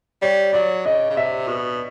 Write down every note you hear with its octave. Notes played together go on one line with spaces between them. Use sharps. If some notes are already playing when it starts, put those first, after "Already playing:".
G3 C#5
F#3 D5
C#3 D#5
C#3
C3 E5
B2